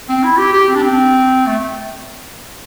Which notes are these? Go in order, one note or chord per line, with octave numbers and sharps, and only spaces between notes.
C4
E4
G4
G4
C4
D4
C4
A3